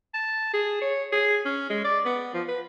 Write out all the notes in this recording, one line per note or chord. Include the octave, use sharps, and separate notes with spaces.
A5
G#4
C#5
G#4
C#4
G#3
D5
B3
F3
B4